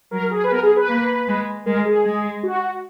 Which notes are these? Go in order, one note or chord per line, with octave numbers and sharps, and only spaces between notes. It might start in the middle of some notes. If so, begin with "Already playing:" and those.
F#3 A#4
G#4
B4
B3 A#4
G#4
B4
A#3
G#3
G#3 A#4
G#4
G#3
F#4